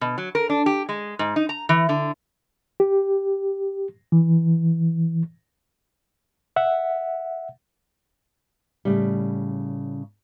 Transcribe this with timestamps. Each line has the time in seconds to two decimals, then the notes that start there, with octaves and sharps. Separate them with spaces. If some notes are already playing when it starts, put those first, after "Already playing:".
0.01 B2
0.18 F#3
0.35 A#4
0.50 D4
0.66 G4
0.89 G#3
1.19 G#2
1.36 D#4
1.49 A#5
1.69 E3
1.89 D3
2.80 G4
4.12 E3
6.56 E5 F#5
8.85 A2 C#3 G3